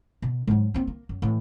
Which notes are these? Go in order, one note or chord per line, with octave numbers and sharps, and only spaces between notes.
B2
G#2 F#3
A#3 C4
A#3
F#2
A2 E3